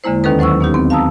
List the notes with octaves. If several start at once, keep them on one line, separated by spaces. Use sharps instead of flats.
E2 D3 G#3 A#3 E4 C5
D#2 D#3 C#4 A4 B4 D#6
F#3 C5 F#5 C#6 E6
B3 D#4 G4
B3 C4
F5 A5 A#5 D#6 E6